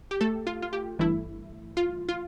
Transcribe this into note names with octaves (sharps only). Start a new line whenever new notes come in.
G4
A3 A4
F4
F4
G4
G1 G2 E3 A3 E4
F4
F4